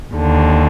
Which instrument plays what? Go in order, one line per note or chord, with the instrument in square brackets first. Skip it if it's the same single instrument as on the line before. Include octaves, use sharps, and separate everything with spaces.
[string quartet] D#2 D3